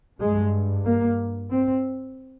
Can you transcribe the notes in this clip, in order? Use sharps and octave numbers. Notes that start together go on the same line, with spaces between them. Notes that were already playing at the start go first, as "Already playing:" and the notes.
G2 G#3
A#3
C4